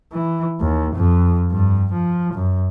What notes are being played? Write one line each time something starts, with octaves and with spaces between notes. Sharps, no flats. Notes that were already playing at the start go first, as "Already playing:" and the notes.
E3
D#2
F2
G2
F3
F#2